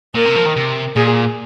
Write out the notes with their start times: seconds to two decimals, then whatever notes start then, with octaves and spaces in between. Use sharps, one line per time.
0.15 A#2 A#4
0.25 C3
0.36 F3
0.46 D#3
0.56 C3
0.96 A#2 G#4